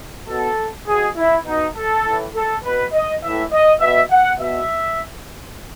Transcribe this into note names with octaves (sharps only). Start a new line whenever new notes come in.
B2 A4
B2 G#4
E4
B2 D#4
A4
A2 E3
A4
B2 B4
D#5
A2 E3 E5
D#5
B2 E5
F#5
B2 E5